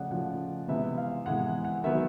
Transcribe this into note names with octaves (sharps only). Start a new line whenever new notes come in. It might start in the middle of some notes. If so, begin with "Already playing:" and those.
Already playing: C#3 F3 A3 D5 D#5 F#5
C#3 F3 A3 F#5
C3 E3 G#3 B3 E5
F5
C3 E3 G#3 B3 F#5
F#5
D#3 F#3 B3 E5